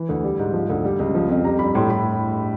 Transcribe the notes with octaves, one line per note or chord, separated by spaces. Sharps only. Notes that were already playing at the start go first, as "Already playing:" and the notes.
Already playing: E3
D2
G3
G#2
F3
D2
G3
C#2
F3
F2
G3 A#5
G2 B5
A2 C6
A2 B5